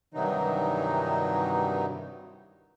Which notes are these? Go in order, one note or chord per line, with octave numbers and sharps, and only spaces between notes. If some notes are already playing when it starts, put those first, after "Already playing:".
G2 C3 D#3 E3 F#3 D#4